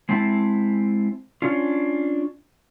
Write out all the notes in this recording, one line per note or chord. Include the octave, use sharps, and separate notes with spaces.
G#3 C4 E4 A5
C#4 D4 F4